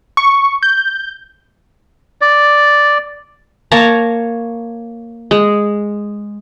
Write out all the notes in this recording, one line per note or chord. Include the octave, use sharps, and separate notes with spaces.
C#6
G6
D5
A#3 C#5 A5 A#5
G#3